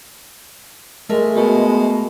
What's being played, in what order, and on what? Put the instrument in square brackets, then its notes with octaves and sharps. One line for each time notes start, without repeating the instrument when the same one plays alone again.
[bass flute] G#3 [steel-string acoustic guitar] A3 A#4 E5
[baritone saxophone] B2